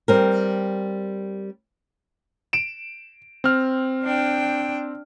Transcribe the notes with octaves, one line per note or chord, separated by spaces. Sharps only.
G3 C4 A#4
D7 E7
C4 F6
D4 G5